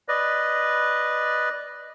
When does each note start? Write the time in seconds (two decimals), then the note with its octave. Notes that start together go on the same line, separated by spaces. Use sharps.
0.08 B4 D5 D#5